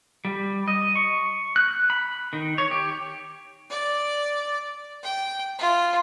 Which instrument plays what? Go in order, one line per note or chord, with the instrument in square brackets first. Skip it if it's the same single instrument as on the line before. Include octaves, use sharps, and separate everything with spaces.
[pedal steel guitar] G3
D#5
C#6
F#6
B5
D#3
C#5
G4
[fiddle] D5
G5
F4